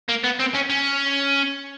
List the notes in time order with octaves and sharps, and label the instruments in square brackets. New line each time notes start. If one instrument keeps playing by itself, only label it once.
[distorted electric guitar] A#3
B3
C4
C#4
C#4